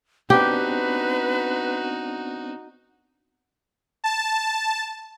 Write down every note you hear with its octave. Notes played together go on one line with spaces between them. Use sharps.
B3 C4 D4 D#4 F#4 G4 B4
A5